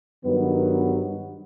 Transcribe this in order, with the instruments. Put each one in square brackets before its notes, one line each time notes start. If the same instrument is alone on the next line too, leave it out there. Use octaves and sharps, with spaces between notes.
[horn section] G2 D#3 F#3 B3